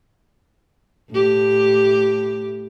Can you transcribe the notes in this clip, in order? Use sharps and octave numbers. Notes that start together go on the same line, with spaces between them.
A2 G4